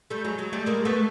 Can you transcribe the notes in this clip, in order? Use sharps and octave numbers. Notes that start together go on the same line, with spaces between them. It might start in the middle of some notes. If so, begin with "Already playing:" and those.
G3 A3
F#3 G#3
F#3 G#3
G3 A3
G#3 A#3
A3 B3